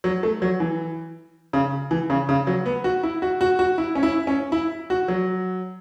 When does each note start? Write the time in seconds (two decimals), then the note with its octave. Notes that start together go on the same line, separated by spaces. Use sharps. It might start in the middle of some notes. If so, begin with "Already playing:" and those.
0.04 F#3
0.23 A3
0.42 F#3
0.60 E3
1.53 C#3
1.91 E3
2.10 C#3
2.29 C#3
2.47 F#3
2.66 B3
2.84 F#4
3.03 E4
3.22 F#4
3.41 F#4
3.59 F#4
3.78 E4
3.95 C#4
4.03 E4
4.27 C#4
4.52 E4
4.90 F#4
5.08 F#3